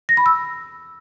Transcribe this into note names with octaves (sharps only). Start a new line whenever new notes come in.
A#6
B5
E6